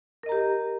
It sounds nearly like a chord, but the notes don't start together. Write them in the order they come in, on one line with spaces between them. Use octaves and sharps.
A#4 D#5 A#5 G4